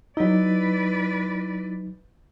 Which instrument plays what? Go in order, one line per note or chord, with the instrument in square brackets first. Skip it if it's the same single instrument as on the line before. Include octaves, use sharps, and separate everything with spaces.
[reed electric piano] F#3 D#4 [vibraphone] E4 [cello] B4 D5